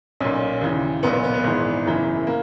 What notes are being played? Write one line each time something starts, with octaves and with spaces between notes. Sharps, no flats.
B1 A#2 C#4
D#2 C#3 E3
B1 A#2 B3
B3
B3
B3
G#1 G#2 E3
F#1 F#2 E3
A#3